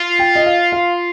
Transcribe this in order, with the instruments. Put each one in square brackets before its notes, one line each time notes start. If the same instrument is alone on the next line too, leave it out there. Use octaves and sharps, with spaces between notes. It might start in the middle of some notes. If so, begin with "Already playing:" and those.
Already playing: [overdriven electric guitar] F4
[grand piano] G5
D#5
F5
F5